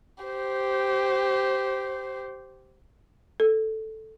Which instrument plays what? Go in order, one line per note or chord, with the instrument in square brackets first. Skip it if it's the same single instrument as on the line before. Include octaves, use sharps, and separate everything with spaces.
[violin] G4 C5
[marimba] A4